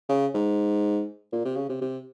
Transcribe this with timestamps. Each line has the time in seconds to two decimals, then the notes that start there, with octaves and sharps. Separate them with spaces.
0.10 C#3
0.35 G#2
1.33 A#2
1.45 C3
1.56 C#3
1.70 C3
1.81 C3